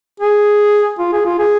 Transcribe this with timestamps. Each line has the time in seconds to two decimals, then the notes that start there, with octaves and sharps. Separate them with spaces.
0.20 G#4
0.99 F4
1.13 G#4
1.26 F4
1.39 G#4